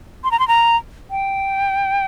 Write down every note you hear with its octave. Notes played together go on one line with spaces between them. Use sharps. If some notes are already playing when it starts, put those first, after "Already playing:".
C6
A#5
C6
A#5
G5